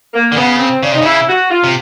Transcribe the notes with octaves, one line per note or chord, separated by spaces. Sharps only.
A#3
D3
C#3 B3
C4
C#3 D4
C3 D#4
C#3 E4
F#4
F4
C3